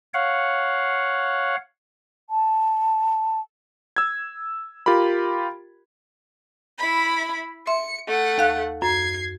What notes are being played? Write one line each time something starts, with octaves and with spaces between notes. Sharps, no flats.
C#5 F5 F#5
A5
E6 G#6
F4 G4 A#4 B5
E4 B5
E5 C6 C#7
A3 F#5
D#2 F5 F#6
F#2 G#6 C7